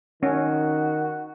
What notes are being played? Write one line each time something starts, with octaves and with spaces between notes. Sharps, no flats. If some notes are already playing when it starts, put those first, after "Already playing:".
D#3 C#4 F#4